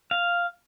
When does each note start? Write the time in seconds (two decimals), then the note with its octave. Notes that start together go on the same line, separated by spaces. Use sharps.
0.11 F5